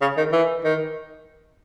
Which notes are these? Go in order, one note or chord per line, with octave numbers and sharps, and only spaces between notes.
C#3
D#3
E3
D#3